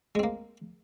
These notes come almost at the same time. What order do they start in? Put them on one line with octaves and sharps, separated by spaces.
G#3 C4 A#3